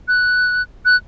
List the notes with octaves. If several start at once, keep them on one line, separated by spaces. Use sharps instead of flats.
F#6
F#6